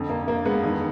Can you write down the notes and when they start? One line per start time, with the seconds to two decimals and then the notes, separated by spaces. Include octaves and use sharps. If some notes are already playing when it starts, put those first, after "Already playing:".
Already playing: F2 D3
0.10 A#3
0.28 A#3
0.45 G#3 B3
0.63 F2 D#3